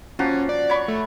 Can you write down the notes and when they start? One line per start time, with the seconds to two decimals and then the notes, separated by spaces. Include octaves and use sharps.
0.19 F3 A#3 C#4 F#4
0.49 D5
0.70 C#5 B5 C#6
0.88 A3